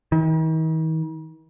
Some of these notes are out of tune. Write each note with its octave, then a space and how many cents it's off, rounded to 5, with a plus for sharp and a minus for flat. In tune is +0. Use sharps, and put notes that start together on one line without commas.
D#3 +45